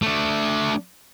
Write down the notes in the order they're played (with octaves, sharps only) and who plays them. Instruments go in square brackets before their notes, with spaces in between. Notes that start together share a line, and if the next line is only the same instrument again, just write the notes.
[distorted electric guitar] A3 D4